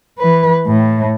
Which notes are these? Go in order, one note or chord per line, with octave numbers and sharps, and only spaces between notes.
E3 B4
A2